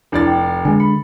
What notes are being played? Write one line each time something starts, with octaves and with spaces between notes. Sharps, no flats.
F1 D4 E4 D5 A6
G5
D3 G#3 G#5
B5 C#7